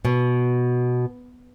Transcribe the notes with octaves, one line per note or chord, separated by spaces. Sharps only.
B2